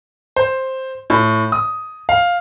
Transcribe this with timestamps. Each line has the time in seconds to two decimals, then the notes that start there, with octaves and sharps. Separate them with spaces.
0.36 C5
1.10 A2
1.52 D#6
2.09 F5